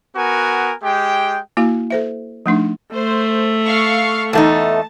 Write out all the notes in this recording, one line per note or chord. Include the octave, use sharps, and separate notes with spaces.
B3 F#4 A#4 G#5
G#3 G4 G5
A#3 E4 F#4 F5
A4 C5 E5
F3 A3 D4 D#4
A3 C5
F5 C#6
E2 A3 D#4 A5